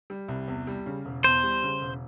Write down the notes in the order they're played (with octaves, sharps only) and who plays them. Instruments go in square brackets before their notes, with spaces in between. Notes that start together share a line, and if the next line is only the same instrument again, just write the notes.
[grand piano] G3
C2
E2
G3
C#3
E1
[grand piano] E2 [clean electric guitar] C5
[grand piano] G3
C#3
E1